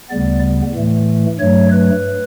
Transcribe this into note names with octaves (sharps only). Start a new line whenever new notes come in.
D2 C#3 G3 B3 D5
A2 E3 A3
G2 F#3 A3 C#5
B4